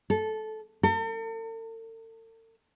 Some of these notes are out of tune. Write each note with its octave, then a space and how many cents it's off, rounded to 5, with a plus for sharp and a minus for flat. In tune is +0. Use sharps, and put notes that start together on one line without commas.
A4 -15
A4 +45